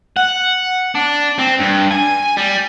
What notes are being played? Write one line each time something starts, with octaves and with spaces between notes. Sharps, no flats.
F#5
D4
C4
G2
G#5
G3